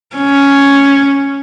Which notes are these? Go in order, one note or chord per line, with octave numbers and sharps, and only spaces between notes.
C#4